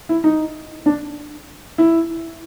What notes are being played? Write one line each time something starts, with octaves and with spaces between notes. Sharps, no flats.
E4
D#4
D4
E4